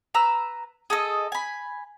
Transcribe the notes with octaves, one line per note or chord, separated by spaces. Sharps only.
B4 A#5 E6
G#4 A4 D#5
G#5 B5